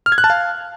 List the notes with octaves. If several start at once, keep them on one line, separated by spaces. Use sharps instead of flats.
F6
G#6
F#6
A5
F5